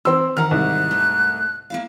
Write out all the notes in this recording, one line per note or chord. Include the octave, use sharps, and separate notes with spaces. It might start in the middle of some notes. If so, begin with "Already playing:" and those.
E3 C4 A#4 C6 E6
D#3 E3 A#4 F#5 A#5 F6
C2 G#2 F#6
A3
A#3 E4 F5